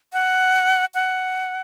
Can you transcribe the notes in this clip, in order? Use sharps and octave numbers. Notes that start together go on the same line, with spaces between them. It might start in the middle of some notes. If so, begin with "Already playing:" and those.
F#5
F#5